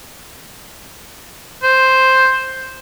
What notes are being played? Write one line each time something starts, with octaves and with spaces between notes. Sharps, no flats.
C5